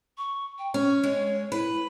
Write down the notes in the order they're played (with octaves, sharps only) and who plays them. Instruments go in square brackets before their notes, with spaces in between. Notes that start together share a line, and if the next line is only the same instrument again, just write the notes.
[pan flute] C#6
G5
[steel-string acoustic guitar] C#4 [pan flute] C#6
[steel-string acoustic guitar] G#3 [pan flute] C#5
[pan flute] E4 [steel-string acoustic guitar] B4